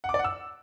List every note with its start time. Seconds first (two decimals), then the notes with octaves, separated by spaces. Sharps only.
0.04 F#5
0.09 D6
0.14 D5
0.19 F#5
0.24 E6